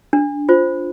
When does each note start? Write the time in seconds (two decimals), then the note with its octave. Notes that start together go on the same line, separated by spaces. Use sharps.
0.13 D4
0.49 F4 C5